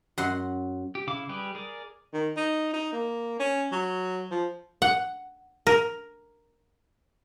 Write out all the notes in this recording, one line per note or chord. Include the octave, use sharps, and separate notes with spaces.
F#2 F#5 C6
G4
C#3 E4 F5 D6
G3 G4 G#4 B4
G#4 A#4 D5
D#3
D#4
D#4
A#3
C#4
F#3
F3
F#5
A#4